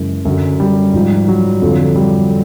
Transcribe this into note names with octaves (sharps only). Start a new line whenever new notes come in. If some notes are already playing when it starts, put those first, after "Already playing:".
Already playing: F#2 C#3 E3 G#3
F#2 D3 F#3
G3
G#2 F3
F#3
F2 D3 F3
G3